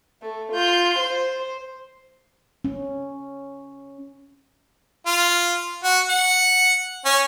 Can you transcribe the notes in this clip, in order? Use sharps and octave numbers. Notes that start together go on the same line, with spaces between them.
A3
F4 G6
C5
C#4
F4
F#4
F#5
C#4